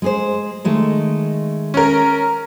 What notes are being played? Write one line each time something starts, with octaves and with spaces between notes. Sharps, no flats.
G#3 G#4 C5
D#3 G#3 A3
C#4 A#4